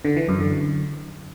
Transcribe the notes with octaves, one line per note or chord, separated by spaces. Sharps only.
D3
E3
F#2
D3